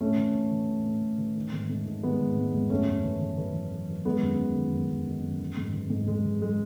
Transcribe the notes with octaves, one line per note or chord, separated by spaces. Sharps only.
A2 A3 C#4
E3
A2
E3
A2
A2
A2
E3
D#3
G#2
G#2
D#3
D#3 G#3 B3
G#2
G#2
G#2
F#2 A3 C#4
F#2
E3
E3
E3
E3
E3
E3
D#3 G#3 B3
F#2
D#3
D#3
F#2
F#2
D#3
F#2
E3
G#2
E3
G#2
G#2 G#3
E3
G#3